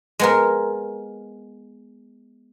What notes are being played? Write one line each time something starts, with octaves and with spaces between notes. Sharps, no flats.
G#3 B3 A#4